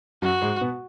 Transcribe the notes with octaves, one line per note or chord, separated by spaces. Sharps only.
F#2 F#3 F#4
G#2 G#3
B2 B3